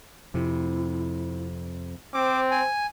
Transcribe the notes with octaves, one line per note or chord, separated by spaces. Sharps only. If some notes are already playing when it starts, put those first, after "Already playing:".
F2 C3 E4
C4 C5 D6
G#5